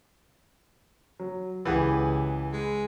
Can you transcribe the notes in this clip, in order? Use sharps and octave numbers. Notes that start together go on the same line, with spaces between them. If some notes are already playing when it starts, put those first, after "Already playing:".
F#3
C#2 E3 G4 G#4 B4 F#5
G#3